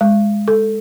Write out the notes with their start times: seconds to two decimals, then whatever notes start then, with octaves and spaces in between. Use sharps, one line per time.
0.01 G#3
0.48 A4